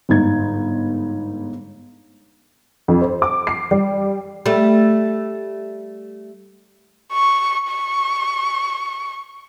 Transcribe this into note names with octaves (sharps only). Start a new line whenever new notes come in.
G1 G#2 D#4 G#6
F2
C5
D6
C7
G3
G3 A3
C#6
C#6